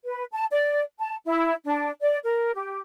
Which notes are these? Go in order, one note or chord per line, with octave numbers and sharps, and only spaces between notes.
B4
A5
D5
A5
E4
D4
D5
A#4
G4